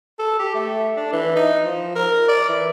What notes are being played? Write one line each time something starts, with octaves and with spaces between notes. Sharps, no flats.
A4
G4
A3
D4
E3
D#4
F3
A#4
D5
E3